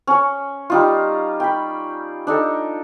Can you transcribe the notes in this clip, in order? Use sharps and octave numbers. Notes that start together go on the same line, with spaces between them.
C#4 C#5
G3 D#4 F4
G5 B5
D4 D#4 A4